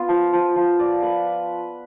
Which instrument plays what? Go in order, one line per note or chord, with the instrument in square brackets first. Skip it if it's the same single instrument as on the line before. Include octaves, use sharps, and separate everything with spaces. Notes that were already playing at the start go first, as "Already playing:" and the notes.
Already playing: [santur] B3 F4
F3
F3
F3
D5
B4